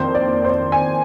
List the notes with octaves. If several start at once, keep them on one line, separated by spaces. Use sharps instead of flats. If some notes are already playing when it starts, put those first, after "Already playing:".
Already playing: F2 D#3 A#3 D4 C5
D5
C5
D5
G#5